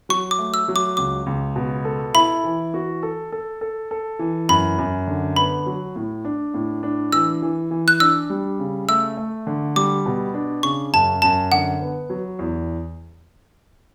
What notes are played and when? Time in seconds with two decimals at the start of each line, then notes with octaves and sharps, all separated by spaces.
0.09 F#3 C#6
0.31 D6
0.39 A3
0.54 E6
0.68 F#3
0.76 D6
0.97 C#2 D6
1.26 C#2
1.56 B2
1.85 A4
2.14 E4 B5
2.44 E3
2.74 F#4
3.03 A4
3.32 A4
3.61 A4
3.91 A4
4.19 E3
4.49 F#2 B5
4.78 F#2
5.07 D3
5.36 B3 B5
5.66 F#3
5.96 A2
6.25 D4
6.54 A2
6.83 D4
7.12 E3 E6
7.42 E3
7.71 E3
7.88 F#6
8.00 D4 E6
8.30 G3
8.59 C#3
8.89 A3 E6
9.17 A3
9.47 D3
9.76 G3 D6
10.06 B2
10.34 D4
10.63 C#3 C#6
10.93 F#2 A5
11.22 F#2 A5
11.52 D3 F#5
11.81 B3
12.10 F#3
12.39 E2